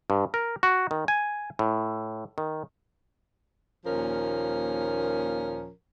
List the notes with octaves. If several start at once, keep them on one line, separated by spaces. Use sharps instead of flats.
G2
A#4
F#4
D#3
G#5
A2
D#3
D#2 A#2 F3 C#4 A#4